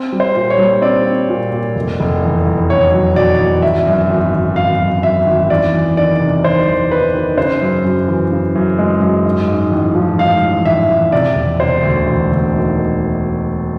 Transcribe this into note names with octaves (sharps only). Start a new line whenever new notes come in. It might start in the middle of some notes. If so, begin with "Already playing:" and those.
Already playing: C4
G3
C5
A#2
C#5
G3
C4 D5
C4
A#2
A#2
F1
F1
E2
E2
F1 C#5
F#3
B2 D5
E2
G#1 E5
F#2
G#1
G#1
G#1 F5
F#2
F#2 E5
G#1
E2 D5
E2
D#3 D5
C3
D#3 C5
E2
D#3 B4
D#3
C#3 C5
F#2
F#2
E3
C#3
F#2
G#3
F#2
G#2
G#2
A1
F3
G#2 F5
A1
A1 E5
A1
C3 D5
E1
C3 C5
D2
E1
D2
D#3